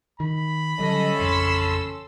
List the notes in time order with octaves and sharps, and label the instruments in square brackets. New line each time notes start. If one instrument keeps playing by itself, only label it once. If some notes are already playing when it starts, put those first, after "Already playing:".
[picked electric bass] D#3 [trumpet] B5
[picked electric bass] D3 F#3 G3 [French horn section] C#4 A4 [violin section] D#5
[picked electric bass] A1 F2 C#3 [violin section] C6 E6